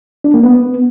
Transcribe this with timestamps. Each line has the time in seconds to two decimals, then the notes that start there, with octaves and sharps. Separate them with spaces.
0.24 D4
0.34 A#3
0.43 B3